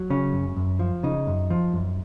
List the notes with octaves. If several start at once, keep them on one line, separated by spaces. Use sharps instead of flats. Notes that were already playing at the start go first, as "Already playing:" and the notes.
Already playing: F#3
C#3 C#4
F#2
F#2
F3
C#3 D#4
F#2
F3
F#2